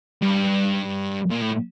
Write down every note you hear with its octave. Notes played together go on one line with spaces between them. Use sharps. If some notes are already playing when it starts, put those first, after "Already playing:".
G2
A#2
A2